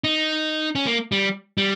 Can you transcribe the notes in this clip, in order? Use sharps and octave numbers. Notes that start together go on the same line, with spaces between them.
D#4
C#4
A#3
G3
G3